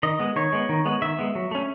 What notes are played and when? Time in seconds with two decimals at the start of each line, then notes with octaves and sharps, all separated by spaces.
0.03 D#3 D#5
0.20 G#3 B3
0.36 D#3 C#5
0.53 G#3 B3
0.69 D#3
0.85 G#3 B3
1.02 D#3 E5
1.19 G#3 B3
1.35 F#3
1.51 A3 C#4